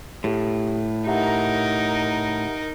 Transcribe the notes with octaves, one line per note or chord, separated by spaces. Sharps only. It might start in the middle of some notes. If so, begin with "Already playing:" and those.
A2 G4 A4
D#4 G4 A#4 E5 F#5